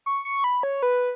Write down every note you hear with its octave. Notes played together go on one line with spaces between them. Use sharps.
C#6
C#6
B5
C#5
B4